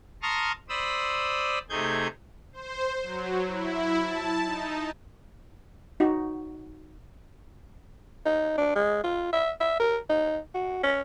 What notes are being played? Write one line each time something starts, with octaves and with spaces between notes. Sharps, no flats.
A5 A#5 C6 C#6 D#6 F6
C5 D5 B5 D#6 E6
C3 A3 D#4 G#4 G6 G#6
C5
F#3
E4
A5
D#4
D#4 F#4
D#4
D4
G#3
F4
E5
E5
A#4
D#4
F#4
C#4